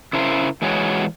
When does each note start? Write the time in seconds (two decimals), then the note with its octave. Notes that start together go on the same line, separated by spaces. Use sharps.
0.13 C#3 E4 A#4 C5
0.62 E3 G#3 F#4 C#5